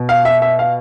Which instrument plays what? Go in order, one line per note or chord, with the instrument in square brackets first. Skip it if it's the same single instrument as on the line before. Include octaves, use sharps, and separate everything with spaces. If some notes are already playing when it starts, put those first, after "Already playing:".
Already playing: [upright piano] B2
F5
E5
E5
F5